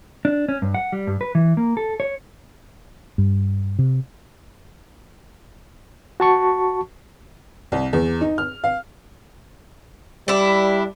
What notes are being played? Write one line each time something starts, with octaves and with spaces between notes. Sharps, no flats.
D4
C#4
G2
F#5
G3
G2
B4
E3
A#3
A4
C#5
G2
C3
F#4 A5 C#6
C2
E2
D#4
F6
F5
G3 D4 E4